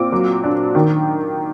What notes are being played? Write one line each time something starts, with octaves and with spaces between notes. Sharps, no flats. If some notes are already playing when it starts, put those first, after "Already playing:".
Already playing: A#2 C4 D6
F#3
D4
D#3